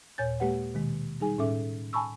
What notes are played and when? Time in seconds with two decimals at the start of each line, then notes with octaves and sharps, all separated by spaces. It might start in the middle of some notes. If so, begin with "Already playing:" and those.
0.18 D#2 A#2 C#5 G#5 G6 A6
0.40 G#3 A#3 G4 B4 F#5
0.74 B2 D#3 G#3
1.20 G3 D#4 G#4 G#5
1.38 A2 C#4 A4 E5 D6
1.93 G#5 A5 B5 C#6 E6